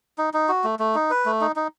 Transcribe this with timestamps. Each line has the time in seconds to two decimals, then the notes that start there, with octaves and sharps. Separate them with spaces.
0.18 D#4
0.34 D#4
0.49 F#4
0.64 A3
0.79 A3
0.95 D#4
1.10 B4
1.26 A3
1.41 D#4
1.56 D#4